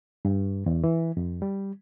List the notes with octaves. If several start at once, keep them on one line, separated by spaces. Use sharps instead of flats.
G2
E2
E3
F2
G3